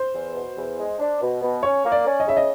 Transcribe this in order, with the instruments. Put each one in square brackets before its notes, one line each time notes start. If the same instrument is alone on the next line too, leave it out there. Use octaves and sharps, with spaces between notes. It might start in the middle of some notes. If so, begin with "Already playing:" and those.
Already playing: [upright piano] C5
[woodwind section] E2
B2
E2
G#3
D4
B2
B2
[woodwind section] C#4 [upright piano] C#5
[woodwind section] A#3
[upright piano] D5
[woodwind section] C#4
[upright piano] D#5
[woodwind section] C#3 [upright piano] E5
[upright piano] D#5